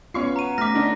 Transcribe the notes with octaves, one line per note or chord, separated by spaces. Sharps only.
B3 C#4 F4 C#6 C7
F#5 A#5 D#7
A3 C#4 D6 F6 A#6 B6
D3 D4 D#4